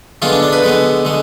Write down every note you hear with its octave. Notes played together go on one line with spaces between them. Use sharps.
D3 G#3 B3 F4
D4
D4
B4
D3 G#3 B3
D3 G#3